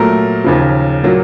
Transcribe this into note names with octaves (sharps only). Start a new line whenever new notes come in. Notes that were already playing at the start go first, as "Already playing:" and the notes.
Already playing: A#2 F#3 A3 A#4
D#2 C#3 F3
A#2 F#3 A#3